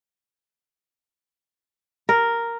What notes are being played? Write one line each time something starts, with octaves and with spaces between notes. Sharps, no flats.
A#4